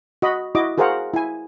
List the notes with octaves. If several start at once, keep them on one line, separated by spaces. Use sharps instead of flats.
F#4 D#5 B5
E4 F#4 D#5 D6
F#4 G#4 A#4 C5 F5 F#5
E4 G#5